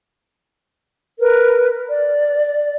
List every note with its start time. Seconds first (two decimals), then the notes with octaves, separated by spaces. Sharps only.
1.20 A#4 B4
1.87 D5